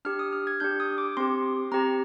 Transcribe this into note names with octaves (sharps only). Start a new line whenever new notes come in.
D4 G4 F6
D#6
F6
G#6
D4 G4 G6
D#6
D6
C4 G4 C6
C4 G4 A#5